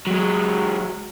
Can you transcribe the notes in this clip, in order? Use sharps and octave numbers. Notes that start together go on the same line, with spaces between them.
F#3 G#3